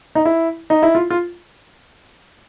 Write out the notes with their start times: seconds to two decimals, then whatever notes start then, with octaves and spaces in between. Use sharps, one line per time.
0.15 D#4
0.25 E4
0.70 D#4
0.82 E4
0.95 F4
1.10 F4